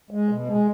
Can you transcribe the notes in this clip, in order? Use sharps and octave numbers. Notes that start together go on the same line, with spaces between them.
G#3
B2
G#3